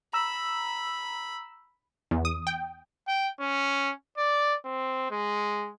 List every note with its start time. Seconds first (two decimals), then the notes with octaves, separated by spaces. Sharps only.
0.13 A#5 B5 E6
2.11 E2
2.25 D#6
2.47 G5
3.08 G5
3.40 C#4
4.18 D5
4.65 C4
5.11 G#3